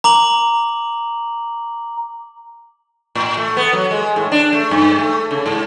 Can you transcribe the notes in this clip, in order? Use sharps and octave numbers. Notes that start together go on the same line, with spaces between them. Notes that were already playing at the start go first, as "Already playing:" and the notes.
A#5 D6 F#7
A2
A3
B3
F#3
G#3
A2
D4
A3
G2
A3
C#3
G#2